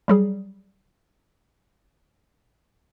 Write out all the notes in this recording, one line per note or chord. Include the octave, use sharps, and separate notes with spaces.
F#3 G3 G#4